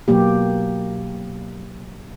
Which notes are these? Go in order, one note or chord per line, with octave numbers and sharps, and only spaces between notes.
B2 F#3 A#3 G4